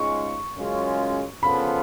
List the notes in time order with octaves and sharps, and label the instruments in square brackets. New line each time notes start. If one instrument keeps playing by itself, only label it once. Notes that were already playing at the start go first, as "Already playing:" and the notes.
Already playing: [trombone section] G#2 G#3 C#4 F4 [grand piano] C#6
[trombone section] F#2 C#3 G#3 C#4 F4
[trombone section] C#3 F3 B3 F4 A4 [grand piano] B5